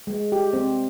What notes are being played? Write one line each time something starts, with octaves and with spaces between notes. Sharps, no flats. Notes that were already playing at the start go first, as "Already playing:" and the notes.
G#3
G4
C4